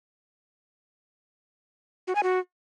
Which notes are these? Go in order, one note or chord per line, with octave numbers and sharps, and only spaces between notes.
F#4
G#5
F#4